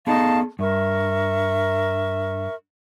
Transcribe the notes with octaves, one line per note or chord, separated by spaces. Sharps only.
B3 D#4 G#4 A4 F5 A5
G2 A#4 E5 C#6